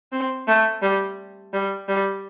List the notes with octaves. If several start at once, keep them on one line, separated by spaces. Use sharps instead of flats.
C4
A3
G3
G3
G3